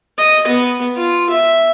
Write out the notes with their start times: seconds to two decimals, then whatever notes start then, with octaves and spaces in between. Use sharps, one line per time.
0.18 D#5
0.47 B3
0.97 F4
1.30 E5